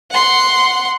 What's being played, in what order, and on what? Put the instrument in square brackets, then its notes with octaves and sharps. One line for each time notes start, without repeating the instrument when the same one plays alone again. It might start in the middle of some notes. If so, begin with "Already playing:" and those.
[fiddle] F#5 C6